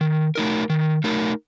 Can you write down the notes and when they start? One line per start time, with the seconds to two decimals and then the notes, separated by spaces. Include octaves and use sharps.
0.01 D#3
0.35 A3 D#4 A#4
0.70 D#3
1.04 A3 D#4 A#4